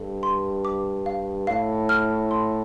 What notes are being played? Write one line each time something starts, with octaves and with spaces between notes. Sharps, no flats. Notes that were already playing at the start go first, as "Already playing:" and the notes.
Already playing: G2 A4
C6
D6
F5
A2 F5
F6
C6